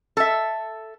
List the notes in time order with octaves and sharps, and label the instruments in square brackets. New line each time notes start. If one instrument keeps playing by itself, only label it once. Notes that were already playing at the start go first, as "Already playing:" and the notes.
[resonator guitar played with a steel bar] A4 E5